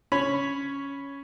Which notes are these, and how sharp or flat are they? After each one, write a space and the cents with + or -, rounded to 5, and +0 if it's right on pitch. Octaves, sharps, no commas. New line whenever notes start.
C#4 +5 C#5 +0 B5 -5